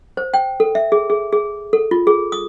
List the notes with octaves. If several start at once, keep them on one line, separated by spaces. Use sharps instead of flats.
C5
G5
A4
E5
G#4
G#4
G#4
A4
F4
G#4
D#6